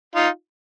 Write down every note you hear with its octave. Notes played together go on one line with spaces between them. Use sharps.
D#4 F4